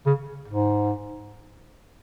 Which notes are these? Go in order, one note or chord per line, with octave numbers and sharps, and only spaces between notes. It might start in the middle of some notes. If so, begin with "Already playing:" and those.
C#3
G#2